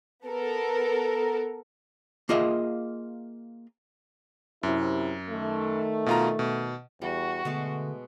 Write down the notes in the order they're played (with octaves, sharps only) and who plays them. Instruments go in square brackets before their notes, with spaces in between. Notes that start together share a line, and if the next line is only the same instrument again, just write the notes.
[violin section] B3 A4 A#4
[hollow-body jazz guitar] A#3 F4 G#4 D#5 E5
[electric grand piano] F#2 [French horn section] C3 E4
[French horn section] D#3 A3
[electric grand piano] B2 F4 A#5
B2
[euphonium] E2 [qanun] G3 [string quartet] F#4
[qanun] B2 G#3 A5 [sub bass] D3 [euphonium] A3